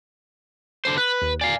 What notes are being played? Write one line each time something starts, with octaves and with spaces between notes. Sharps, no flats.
D3 C5
B4 F#6
D#2
D5 F5 G#5